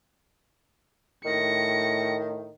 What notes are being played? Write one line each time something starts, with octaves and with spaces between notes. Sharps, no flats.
A2 D#3 A#6 C#7